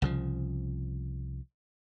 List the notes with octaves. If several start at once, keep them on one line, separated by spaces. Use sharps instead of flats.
C2 C#3 F3